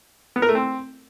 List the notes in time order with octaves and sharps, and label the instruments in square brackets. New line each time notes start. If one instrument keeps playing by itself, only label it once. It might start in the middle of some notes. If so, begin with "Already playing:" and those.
[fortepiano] B3
A#4
A3
C4